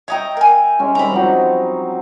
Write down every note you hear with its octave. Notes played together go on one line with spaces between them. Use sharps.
C#5 D#5 E5 G5 A#5
A#4 G#5
G#3 C#4 G4
D#3 G3 C4 A#5 B5
F3 F#3 D#4